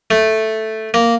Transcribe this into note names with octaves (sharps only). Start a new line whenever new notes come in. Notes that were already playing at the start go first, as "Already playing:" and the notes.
A3
A#3